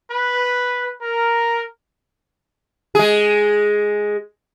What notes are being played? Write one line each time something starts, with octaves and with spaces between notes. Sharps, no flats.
B4
A#4
G#3 G#4